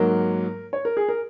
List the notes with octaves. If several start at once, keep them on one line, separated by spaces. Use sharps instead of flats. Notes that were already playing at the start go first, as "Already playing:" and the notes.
Already playing: G#2 F#3 A#3 A#4
C#5
A#4
G#4
A#4